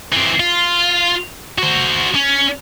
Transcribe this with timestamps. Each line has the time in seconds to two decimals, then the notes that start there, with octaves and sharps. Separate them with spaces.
0.12 E3 C4
0.40 F4
1.58 F#4 C5
2.15 C#4